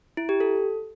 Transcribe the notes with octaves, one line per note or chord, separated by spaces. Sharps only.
E4
G4
A4